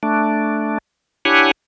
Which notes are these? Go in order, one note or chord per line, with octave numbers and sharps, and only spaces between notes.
A3 D4
D4 E4 G4 C#5 F#5 G#5